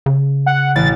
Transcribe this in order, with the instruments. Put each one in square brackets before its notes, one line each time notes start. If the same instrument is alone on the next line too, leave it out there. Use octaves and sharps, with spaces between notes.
[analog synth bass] C#3
[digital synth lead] F#5
[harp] A1 B2 [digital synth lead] A6